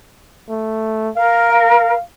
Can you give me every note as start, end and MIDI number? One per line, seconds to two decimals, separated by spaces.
0.49 1.10 57
1.16 1.92 70
1.16 1.52 77
1.52 2.02 77